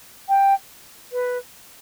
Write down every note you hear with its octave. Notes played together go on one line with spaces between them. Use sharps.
G5
B4